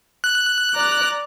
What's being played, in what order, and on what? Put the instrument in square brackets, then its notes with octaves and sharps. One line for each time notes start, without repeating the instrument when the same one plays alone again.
[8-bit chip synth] F#6
[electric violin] D5 A#5